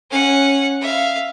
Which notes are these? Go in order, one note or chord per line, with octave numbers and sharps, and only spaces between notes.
C#4 F#5
E5 F5